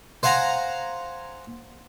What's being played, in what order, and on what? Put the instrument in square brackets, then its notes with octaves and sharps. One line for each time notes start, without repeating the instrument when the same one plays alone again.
[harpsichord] C5 F5 F#5 G#5 A#5